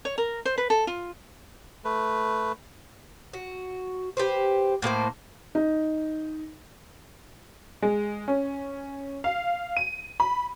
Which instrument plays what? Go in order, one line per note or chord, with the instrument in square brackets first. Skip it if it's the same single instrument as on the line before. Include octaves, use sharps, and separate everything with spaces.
[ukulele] C#5
A#4
C5
B4
A4
F4
[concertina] A3 B4
[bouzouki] F#4
G4 B4 C5
A2 A#3 G#4 C5
[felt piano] D#4
[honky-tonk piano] G#3
C#4
F5
D#7
B5